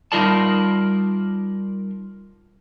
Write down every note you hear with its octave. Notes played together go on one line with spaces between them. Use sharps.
G3 D#4 F4 A#4 D5 A5